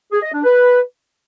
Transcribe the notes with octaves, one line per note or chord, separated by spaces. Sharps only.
G#4
D#5
D4
B4